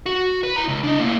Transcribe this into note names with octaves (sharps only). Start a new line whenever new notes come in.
F#4
B4
E4 A#5
C#2
D4 D#5
A2 A#3